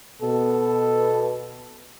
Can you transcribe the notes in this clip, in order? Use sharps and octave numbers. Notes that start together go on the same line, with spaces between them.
B2 B3 A4